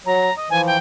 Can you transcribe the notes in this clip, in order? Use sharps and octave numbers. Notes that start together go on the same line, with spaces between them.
F#3 A#5
D#5
E3 F3 G#5
G5